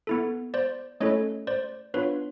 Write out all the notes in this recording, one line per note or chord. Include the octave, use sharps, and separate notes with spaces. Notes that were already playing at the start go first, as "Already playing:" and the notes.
B3 E4 A4
C5 D5
A3 C#4 E4 A4 C#5 D#5
C5 D5
B3 D4 F4 B4 C#5